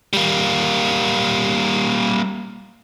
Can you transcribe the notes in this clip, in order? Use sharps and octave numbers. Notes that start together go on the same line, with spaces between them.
G3 A#3